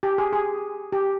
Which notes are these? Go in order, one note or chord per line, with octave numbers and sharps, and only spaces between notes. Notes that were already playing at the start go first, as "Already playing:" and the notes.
G4
G#4
G#4
G4